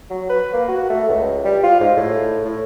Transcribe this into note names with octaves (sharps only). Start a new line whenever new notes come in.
F#3
B4
A#3
F#4
A3
C#2
G3
F4
G#2
A2
A2